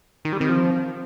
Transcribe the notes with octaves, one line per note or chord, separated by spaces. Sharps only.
D#3
G3
D#3 C4
F3